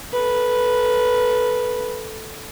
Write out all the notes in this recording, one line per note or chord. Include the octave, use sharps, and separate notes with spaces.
A4 B4